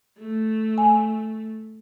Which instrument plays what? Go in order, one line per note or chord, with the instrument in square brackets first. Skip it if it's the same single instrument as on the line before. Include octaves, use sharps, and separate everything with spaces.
[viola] A3
[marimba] G#5